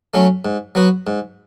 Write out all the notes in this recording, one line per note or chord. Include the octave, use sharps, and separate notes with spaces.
F#3 A3 C#4
G#2
F#3 B3 F#4
G#2